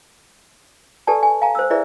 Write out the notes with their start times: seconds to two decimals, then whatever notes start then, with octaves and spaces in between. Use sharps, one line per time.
1.07 G4 A4 B4 D5 G#5 A5
1.23 G#5
1.42 F5 G#5 A#5
1.55 C5 E6
1.70 E4 G#4 B4 D5 E5